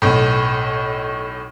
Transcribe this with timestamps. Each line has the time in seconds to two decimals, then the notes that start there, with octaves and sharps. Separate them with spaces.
0.02 B1 A2